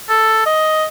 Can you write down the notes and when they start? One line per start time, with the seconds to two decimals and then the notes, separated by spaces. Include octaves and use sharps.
0.09 A4
0.46 D#5